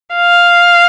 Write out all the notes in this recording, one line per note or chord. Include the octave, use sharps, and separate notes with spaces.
F5